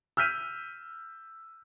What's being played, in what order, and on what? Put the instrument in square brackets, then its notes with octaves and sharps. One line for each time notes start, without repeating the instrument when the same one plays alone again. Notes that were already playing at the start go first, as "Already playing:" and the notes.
[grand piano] E6 F6 G6 B6 D#7